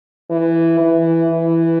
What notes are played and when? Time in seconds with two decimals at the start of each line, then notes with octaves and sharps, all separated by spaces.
0.30 E3
0.80 E3
1.31 E3